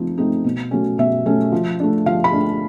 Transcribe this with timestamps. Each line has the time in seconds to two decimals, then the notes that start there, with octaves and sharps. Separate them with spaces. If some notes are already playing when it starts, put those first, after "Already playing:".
Already playing: F3 A3 C4 D#4
0.18 A3 C4 D#4
0.44 B2
0.71 F#3 A3 C#4
0.98 B2 E5
1.26 F#3 A3 C#4
1.52 F3
1.80 A3 D4
2.06 F3 F5
2.24 B5
2.33 A3 D4